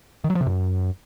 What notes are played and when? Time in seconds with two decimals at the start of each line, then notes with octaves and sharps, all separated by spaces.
0.24 D#3
0.30 F#3
0.35 F3
0.41 C3
0.46 F#2